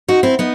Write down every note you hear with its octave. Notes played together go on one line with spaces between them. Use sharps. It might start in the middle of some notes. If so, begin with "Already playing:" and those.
D#4 F#4
C4 E4
B3 D#4